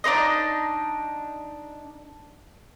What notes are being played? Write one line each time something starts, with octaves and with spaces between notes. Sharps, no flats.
D4 D#4 C5 D#5